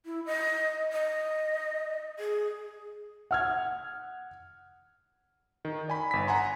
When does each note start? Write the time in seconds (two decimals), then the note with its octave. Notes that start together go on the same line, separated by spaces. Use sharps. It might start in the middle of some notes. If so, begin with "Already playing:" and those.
0.06 E4
0.26 D#5
0.93 D#5
2.19 G#4
3.31 F#5 F6 G#6
5.65 D#3
5.88 D5 G#5 B5
6.11 G1 B6
6.27 F#5 G#5 A#5 C6